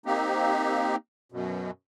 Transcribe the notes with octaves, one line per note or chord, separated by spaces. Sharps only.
A#3 C4 D#4 G4
F#2 B2